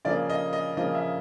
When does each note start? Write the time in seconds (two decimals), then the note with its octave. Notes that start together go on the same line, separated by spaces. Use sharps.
0.05 C#3 F3 A#3 D5
0.30 D#5
0.53 D#5
0.77 C#3 F3 A#3 D#5
0.95 E5